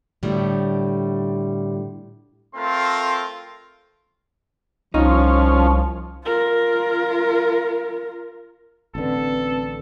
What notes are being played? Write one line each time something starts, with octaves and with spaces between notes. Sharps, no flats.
A2 D3 G3
A3 C4 F4 A#4 C6
C2 F3 C#4 D#4 F4
F4 A#4
A1 D3 C4 A4 B4